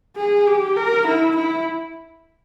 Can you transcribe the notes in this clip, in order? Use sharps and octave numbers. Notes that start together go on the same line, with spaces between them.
G#4
G4
A#4
E4
E4